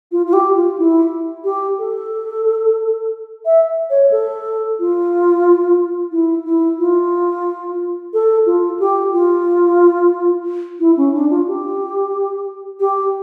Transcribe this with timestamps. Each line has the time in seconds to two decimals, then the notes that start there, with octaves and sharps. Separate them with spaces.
0.12 F4
0.26 F4
0.33 G4
0.55 F4
0.78 E4
1.44 G4
1.79 A4
3.46 E5
3.90 C#5
4.11 A4
4.79 F4
6.12 E4
6.45 E4
6.79 F4
8.13 A4
8.46 F4
8.80 G4
9.13 F4
10.80 E4
10.97 C#4
11.14 D4
11.31 F4
11.47 G4
12.80 G4